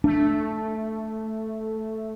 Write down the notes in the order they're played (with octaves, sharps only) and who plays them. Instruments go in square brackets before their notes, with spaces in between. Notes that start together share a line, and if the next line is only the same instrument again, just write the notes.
[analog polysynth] A3 [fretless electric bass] D4